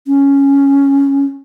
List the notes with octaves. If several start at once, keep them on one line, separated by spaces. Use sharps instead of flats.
C#4